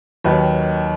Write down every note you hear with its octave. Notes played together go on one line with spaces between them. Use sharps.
D#2 D#3 F#3 B4